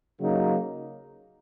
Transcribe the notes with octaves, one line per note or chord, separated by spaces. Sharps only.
C#3 F#3 A#3 D#4